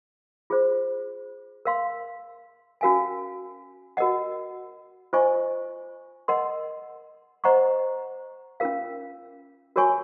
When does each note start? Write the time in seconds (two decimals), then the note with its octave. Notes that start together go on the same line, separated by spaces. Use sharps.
0.50 F4 G#4 C5
1.65 A#4 F5 C6
2.81 C#4 F#4 A#4 F5 G#5
3.97 F#4 A#4 D#5 F#5
5.13 F4 C5 D#5 G#5 C#6
6.28 A#4 D#5 F#5 C6
7.44 C5 D#5 F#5 A#5 C#6
8.60 C#4 F4 A#4 F5
9.76 F#4 A#4 C#5 G#5 C#6